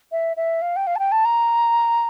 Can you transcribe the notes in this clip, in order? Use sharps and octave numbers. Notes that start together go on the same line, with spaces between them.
E5
E5
F5
G5
F5
A5
G5
A5
A#5